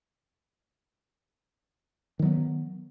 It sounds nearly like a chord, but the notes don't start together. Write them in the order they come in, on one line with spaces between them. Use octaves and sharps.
D#3 F#3 B3